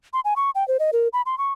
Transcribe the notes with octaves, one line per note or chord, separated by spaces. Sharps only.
C6
G#5
C#6
G5
C5
D#5
A#4
B5
C6
C#6